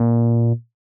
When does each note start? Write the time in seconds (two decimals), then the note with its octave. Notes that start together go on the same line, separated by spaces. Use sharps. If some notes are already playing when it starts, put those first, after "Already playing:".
Already playing: A#2